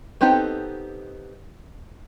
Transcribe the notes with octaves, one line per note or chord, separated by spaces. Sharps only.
B3 C4 D#4 G4 A4